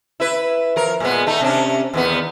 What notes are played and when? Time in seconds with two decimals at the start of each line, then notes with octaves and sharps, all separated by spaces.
0.20 E4 B4
0.76 F3 A#4
1.00 A#2 G#3 B3
1.27 A3 D#4
1.41 C3 C#4 D4
1.94 E2 D#3 B3